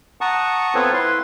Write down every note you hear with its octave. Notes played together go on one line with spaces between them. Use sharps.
F#5 A5 A#5 C#6 D#6
B3 C4 F4 A4 B4 C#5
E4 B4 C6